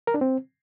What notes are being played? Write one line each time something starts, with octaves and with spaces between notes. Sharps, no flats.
A#4
D4
C4